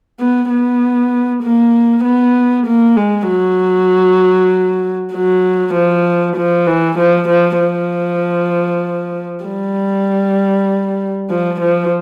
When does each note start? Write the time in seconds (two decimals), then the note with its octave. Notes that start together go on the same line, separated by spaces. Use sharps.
0.20 B3
0.50 B3
1.43 A#3
2.04 B3
2.67 A#3
2.96 G#3
3.28 F#3
5.13 F#3
5.74 F3
6.36 F3
6.67 E3
6.98 F3
7.28 F3
7.59 F3
9.45 G3
11.30 F3
11.61 F3